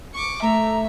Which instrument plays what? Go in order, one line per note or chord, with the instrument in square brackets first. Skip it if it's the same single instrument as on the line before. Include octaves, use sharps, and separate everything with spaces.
[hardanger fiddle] C#6 D6
[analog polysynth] A3 [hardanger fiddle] E5 [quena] A#5